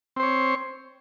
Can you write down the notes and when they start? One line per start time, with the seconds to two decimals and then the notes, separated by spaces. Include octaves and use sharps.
0.16 C4
0.20 C5
0.23 C#5